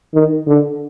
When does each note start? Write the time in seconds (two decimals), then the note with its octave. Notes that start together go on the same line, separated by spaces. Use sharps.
0.14 D#3
0.47 D3